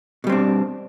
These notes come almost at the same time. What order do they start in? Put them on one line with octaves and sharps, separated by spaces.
B2 G3 C4 D4